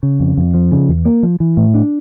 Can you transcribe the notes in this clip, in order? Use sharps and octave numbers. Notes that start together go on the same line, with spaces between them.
C#3
F2
F2
F3
C#3
E2
A#3
F3
E3
A2
D4